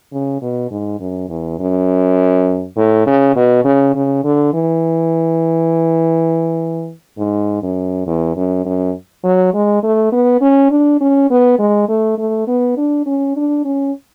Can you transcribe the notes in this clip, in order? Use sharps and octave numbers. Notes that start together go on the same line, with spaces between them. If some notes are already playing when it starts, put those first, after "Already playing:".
C#3
B2
G#2
F#2
E2
F#2
A2
C#3
B2
C#3
C#3
D3
E3
G#2
F#2
E2
F#2
F#2
F#3
G#3
A3
B3
C#4
D4
C#4
B3
G#3
A3
A3
B3
D4
C#4
D4
C#4